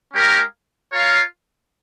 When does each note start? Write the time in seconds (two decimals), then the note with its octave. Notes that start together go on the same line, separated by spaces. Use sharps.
0.13 G#3 C#4 G4 A#4 F5
0.93 F4 A#4 C#5 F5